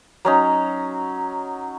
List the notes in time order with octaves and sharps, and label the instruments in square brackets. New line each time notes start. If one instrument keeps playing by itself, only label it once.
[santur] F#3 C#4 D#4